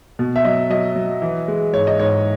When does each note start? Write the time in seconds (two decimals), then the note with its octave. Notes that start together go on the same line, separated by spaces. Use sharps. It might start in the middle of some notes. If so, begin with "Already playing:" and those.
0.19 B2
0.36 E5
0.45 F#3 D#5
0.70 F#3 D#5
0.96 F#3
1.22 E3
1.48 G#3
1.74 G#2 C#5
1.87 D#5
1.99 G#2 C#5